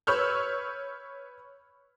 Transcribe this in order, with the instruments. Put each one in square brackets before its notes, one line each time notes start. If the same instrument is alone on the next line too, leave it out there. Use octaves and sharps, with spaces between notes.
[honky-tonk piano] B4 C#5 C#6 E6 F6 G6